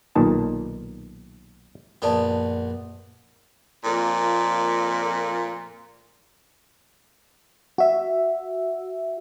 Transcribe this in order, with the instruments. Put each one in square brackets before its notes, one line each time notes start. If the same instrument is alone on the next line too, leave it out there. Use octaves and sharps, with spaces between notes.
[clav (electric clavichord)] B1 A#2 D#3 A5
[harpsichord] A#1 B3 [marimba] F#2 D5 A5
[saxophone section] F2 A#2 A#3
[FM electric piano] F#4 E5